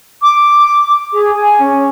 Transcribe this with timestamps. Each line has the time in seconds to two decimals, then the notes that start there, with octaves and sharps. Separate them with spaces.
0.22 D6
1.13 G#4
1.36 G#5
1.59 C#4